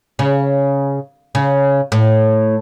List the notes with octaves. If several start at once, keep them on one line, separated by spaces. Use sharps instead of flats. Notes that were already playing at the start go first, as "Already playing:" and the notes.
C#3
C#3
A2